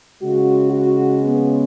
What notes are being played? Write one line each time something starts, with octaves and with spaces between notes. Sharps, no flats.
C#3 G#3 F#4
F#4
B3